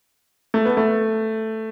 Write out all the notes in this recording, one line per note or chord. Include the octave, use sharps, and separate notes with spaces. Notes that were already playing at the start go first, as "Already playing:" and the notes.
A3
B3
A3